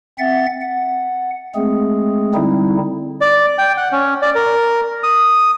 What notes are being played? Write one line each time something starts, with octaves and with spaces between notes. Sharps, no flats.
C4 E5 F#5 A6
F#5
G#3 A3 C4 G#4
D3 G3 C4 D#4 E4
D5
G5
F#5
C#4
D5
A#4
D#6